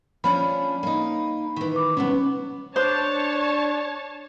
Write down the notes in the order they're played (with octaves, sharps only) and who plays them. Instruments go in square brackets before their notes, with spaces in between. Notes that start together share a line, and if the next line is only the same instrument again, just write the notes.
[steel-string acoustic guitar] F3 C#4 D4 [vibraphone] B5
[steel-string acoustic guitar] A#3 D#4
D#3 E3
[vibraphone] D6
[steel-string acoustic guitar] C3 F#3 B3 [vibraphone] C#4
[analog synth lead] D4 [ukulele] C5 [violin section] C#5 A5